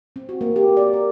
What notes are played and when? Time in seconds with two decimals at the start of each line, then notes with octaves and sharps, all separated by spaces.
0.16 C4
0.29 F#4
0.41 A#3
0.56 G4
0.77 D5
0.93 A#4